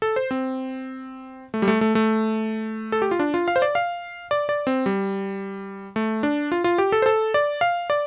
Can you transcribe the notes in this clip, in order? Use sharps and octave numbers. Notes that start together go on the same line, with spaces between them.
A4
C5
C4
A3
G3
A3
A3
A3
A4
G4
F4
D4
F4
F5
C5
D5
F5
D5
D5
C4
G3
A3
D4
F4
F4
G4
A4
C5
A4
D5
F5
D5